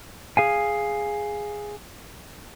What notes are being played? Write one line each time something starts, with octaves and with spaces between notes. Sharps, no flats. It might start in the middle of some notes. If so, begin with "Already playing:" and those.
G#4 F5 G#5